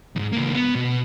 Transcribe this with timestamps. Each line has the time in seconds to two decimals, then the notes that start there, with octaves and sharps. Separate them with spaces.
0.16 E2 G#2
0.33 C#2 A#3
0.55 B3
0.75 B2